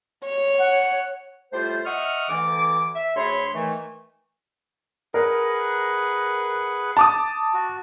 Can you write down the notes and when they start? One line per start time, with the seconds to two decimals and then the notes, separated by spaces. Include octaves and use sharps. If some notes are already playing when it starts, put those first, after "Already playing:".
0.25 C#5
0.60 F#5
1.53 A2 G3 A3 F4 C5
1.85 D#5 E5 F#5 C#6 D#6 F6
2.29 D2 E3 D6
2.95 E5
3.16 D2 F#3 G#4 C#5 B5 C6
3.54 D#3 E3 A3
5.14 G#4 A#4 B4 F#5
6.97 A5 D6 D#6
7.54 F#4